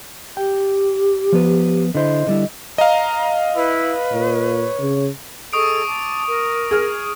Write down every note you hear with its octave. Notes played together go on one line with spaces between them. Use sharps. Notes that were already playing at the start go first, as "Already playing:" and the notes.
G4 G5
F3 B3 B4
D3 E4 C5 D#5
D3 G3 E4
D#5 F5 A#5
E4 B4
A#2 C#5
C#3
G#4 A4 D#5 C#6 D#6 D7
A5 D6
A#4
G#4 F6